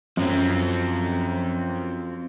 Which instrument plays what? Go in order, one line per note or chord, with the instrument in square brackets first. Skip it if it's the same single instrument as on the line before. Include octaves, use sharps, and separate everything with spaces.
[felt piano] F#2 [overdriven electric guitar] F3 C4